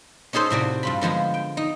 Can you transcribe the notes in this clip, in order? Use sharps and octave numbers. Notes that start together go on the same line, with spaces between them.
C#4 D#4 G#4 A4 C5
A2 C3 F#4 D5
G2 F4 B5
D3 F3 G#3 B3
G5
D#4